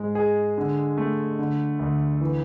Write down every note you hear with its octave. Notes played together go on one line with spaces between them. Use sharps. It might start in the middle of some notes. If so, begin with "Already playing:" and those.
Already playing: G#2 G#3
G#4
D3
A3
D3
D2
E3